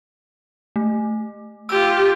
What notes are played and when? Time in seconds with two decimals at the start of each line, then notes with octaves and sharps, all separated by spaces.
0.76 A3
1.69 F4 G4 E6